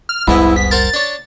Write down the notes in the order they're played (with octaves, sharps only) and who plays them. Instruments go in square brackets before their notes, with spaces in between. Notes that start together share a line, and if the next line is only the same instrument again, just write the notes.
[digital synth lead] F6
[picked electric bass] F1 C2 G3 [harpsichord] G#2 B3 D#5 [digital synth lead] E4
[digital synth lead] B6
[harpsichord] A#4 C5 F#5 [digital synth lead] A6
[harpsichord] D4 C#5